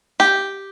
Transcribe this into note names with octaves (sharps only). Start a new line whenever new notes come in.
G4